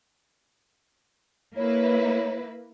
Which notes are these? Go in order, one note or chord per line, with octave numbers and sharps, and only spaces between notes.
A#3 E4 B4 C#5